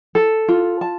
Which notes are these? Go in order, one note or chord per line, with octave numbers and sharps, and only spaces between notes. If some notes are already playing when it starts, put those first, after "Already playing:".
A4
F4
A5